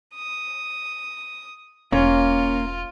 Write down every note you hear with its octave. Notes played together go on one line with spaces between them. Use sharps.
D#6
E1 A#3 C#4 F4